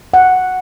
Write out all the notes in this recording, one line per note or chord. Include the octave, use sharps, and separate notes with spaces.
F#5